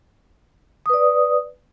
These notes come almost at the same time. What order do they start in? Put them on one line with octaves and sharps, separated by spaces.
D#6 B4 D5